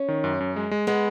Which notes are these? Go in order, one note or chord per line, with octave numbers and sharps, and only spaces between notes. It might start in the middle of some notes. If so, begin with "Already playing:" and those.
Already playing: C#4
D#3
F#2
F#2
G#3
G#3
G#3 B3